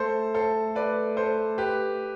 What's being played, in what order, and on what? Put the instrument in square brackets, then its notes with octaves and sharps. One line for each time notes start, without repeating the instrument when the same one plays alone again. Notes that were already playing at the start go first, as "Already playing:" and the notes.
Already playing: [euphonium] A3 [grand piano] A4 C5
[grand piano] A4 C5
B4 D5
A4 C5
G4 B4